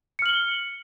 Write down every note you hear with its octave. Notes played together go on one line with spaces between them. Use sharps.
F6 C#7 F#7 G7